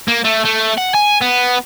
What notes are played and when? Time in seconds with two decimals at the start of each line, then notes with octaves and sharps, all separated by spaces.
0.08 A#3
0.25 A3
0.45 A3
0.78 F#5
0.95 G#5
1.21 B3